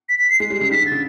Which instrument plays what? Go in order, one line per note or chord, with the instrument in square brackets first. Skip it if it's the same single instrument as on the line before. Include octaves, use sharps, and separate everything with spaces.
[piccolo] B6
B6
C7
[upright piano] G#3 [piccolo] C7
[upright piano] G3
C#3
[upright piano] D#3 [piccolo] B6
[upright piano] D3
[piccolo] A6
[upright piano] C#3